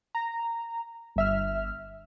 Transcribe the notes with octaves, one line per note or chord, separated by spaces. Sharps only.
A#5
G1 E5 F6